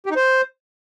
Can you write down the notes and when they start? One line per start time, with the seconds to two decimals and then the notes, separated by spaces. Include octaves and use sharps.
0.06 G4
0.11 D#4
0.16 C5